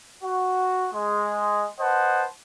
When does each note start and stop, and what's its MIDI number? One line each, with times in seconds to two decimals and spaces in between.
0.24 0.88 66
0.93 1.66 56
1.80 2.26 71
1.80 2.26 72
1.80 2.26 75
1.80 2.26 78
1.80 2.26 81